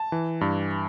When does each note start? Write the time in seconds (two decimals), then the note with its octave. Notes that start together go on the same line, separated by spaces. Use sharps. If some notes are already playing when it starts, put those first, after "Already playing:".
Already playing: A5
0.12 E3
0.41 G2